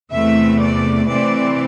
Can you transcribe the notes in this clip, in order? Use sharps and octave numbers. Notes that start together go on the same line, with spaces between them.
E2 C3 E3 A3 E5
D5
C3 E3 A3 C4 D5